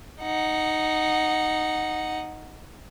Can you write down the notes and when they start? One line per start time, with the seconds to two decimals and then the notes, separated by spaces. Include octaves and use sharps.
0.22 D#4 F#5